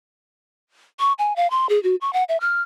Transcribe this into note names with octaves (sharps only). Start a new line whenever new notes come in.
C#6
G#5
F5
C6
G#4
F#4
C#6
F#5
E5
F6